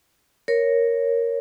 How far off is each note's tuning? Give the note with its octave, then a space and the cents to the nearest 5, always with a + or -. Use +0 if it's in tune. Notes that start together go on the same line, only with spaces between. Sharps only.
A#4 +0 C#5 +0